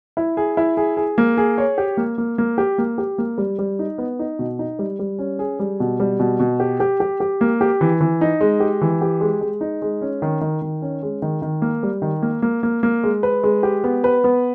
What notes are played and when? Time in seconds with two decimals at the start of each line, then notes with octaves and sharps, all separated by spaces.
0.17 E4
0.37 G#4
0.57 E4
0.77 G#4
0.97 G#4
1.18 A#3
1.37 G#4
1.58 C#5
1.78 G4
1.97 A#3
2.18 A#3
2.38 A#3
2.58 G4
2.78 A#3
2.98 G4
3.18 A#3
3.38 G3
3.59 G3
3.79 D#4
3.98 B3
4.19 D#4
4.39 B2
4.59 D#4
4.79 G3
4.99 G3
5.19 C#4
5.39 G#4
5.59 G3
5.80 B2
6.00 G3
6.20 B2
6.40 B2
6.60 G4
6.80 G4
7.00 G4
7.20 G4
7.41 A#3
7.61 G4
7.81 E3
8.01 E3
8.21 D#4
8.41 G#3
8.60 G4
8.81 E3
9.01 G4
9.21 G#3
9.41 G#3
9.61 D#4
9.82 G#3
10.01 C#4
10.22 D#3
10.41 D#3
10.62 D#3
10.82 C#4
11.03 G#3
11.22 D#3
11.42 D#3
11.62 A#3
11.83 G3
12.02 D#3
12.22 A#3
12.42 A#3
12.63 A#3
12.83 A#3
13.03 G#3
13.23 B4
13.43 G#3
13.63 G4
13.84 B3
14.04 B4
14.24 B3